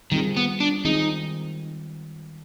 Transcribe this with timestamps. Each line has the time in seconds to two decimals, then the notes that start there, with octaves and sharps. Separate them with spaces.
0.12 D#3 G3 C4 F4 G#4
0.37 B3
0.60 D4
0.84 D#3 G#3 C4 D#4 F4 G#4